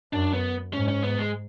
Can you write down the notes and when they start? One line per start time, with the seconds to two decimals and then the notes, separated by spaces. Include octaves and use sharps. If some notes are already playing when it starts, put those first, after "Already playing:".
0.13 F#2 D4
0.33 B3
0.73 G#2 C#4
0.88 C#4
1.04 B3
1.18 G#3